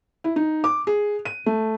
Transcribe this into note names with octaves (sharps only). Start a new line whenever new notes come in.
E4
D#4
D6
G#4
D#7
A3